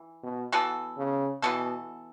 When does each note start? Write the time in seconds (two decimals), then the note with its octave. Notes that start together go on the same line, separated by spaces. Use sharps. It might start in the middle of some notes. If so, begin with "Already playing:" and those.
Already playing: E3
0.23 B2
0.52 E3 B3 F#4 A4
0.97 C#3
1.42 B2 E3 B3 F#4 A4